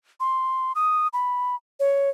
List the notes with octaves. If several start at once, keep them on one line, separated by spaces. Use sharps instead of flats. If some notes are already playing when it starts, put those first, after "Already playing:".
C6
D#6
B5
C#5